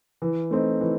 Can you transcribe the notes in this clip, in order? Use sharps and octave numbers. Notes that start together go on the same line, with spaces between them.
E3
A3 C4 D#4
E3